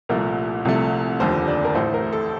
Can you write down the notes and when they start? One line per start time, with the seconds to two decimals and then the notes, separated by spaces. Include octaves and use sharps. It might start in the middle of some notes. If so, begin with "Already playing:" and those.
0.09 C2 A#2 F3 A3 A#4
0.65 C2 C3 F3 A3
1.20 F1 D#2 D3 F3 C5
1.48 D5
1.65 A#4
1.75 A1 A2 A3 C5
1.94 A#4
2.13 A4